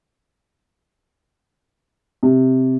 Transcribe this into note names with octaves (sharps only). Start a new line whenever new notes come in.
C3